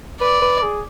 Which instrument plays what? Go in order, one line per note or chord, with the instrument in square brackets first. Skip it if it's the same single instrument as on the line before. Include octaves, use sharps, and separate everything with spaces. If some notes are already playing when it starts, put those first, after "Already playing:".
[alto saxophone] B4 [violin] D5
[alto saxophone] B4
G#4